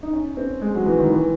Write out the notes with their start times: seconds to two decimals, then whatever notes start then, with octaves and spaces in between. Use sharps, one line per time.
0.03 D#4
0.13 C#4
0.37 C4
0.61 G#3
0.75 F#3
0.86 E3
0.99 D#3
1.12 E3